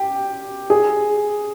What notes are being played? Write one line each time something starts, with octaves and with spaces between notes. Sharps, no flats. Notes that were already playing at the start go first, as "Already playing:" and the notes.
Already playing: G4
G#4